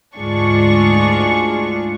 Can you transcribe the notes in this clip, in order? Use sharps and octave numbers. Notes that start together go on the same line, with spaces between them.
D2 G#2 D4 F4 G#4 C#6